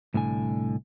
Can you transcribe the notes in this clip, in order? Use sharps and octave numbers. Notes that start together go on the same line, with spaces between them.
C2 A2 D3 G#5